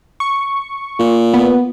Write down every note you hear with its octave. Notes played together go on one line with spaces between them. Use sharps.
C#6
A#2
B3